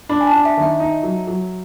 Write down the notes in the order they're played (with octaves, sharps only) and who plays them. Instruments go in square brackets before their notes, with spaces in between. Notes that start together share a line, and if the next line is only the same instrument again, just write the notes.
[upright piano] D4 [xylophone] B5
[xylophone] G#5
A5
[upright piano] D4
[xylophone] E5
[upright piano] D#3
[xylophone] E5
[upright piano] D#4
F#3
F#3